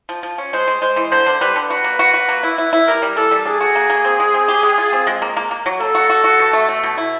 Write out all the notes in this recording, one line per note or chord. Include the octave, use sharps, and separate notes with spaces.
F3
F3
C#4
G#3 C5
G#3
G#3 C5
E3
D3 C5
D3
G3 B4
D3
F#4 B4
A#3
F#4
F#4
A#3
E4
E4
E4
G3 A#4
G3
E3 A4
G3
D4 G#4
F#4
A#3
A#3
C4
G#3
C4
G4
G#3
F4
C4
G#3
A#3
A#3
A#3
F#3
A#3 A4
F#4
F#4
F#4
B2
A3
A3
B2
E4